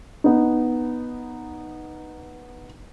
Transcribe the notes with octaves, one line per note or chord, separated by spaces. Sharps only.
B3 D#4